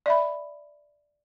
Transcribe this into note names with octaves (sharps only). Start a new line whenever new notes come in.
D5 E5 B5